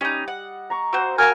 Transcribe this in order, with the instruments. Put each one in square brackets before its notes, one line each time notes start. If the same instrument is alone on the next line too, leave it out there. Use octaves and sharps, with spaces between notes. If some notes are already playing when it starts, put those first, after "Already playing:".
[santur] G3 D#5 [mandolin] C#4 D#4
[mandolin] F#5
[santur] A#5 C#6
[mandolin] C4 C5 [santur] F#4
[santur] F#3 F5 [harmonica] A#4 G#5 [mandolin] A5 F6